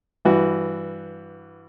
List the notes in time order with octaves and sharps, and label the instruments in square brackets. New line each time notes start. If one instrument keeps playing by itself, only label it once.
[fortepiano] G2 E3 F#4